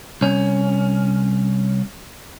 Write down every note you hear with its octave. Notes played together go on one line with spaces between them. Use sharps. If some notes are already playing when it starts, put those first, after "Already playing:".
C2 C#4